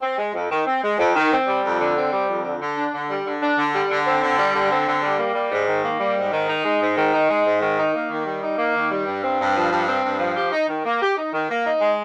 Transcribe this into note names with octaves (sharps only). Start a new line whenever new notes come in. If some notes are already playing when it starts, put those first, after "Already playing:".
C4
G#3
F2
D#3
C4
G#3
F2
D#3
C4
G3
F2
D3
C4
G3
F2
D3
D3
D4
D3
G3
D3
D4
D3
G3
D3
C4
D3
G3
D3
C4
D3
G3
A#3
G3
G#2
D#3
A#3
G3
G#2
D#3
D#4
G#3
G#2
D#3
D#4
G#3
G#2
D#3
D#4
A#3
D#3
G3
D#4
A#3
D#3
G3
G2
C4
G2
F3
G2
C4
G2
F3
G4
D#4
D#3
A#3
G4
D#4
D#3
A#3
D#4
G#3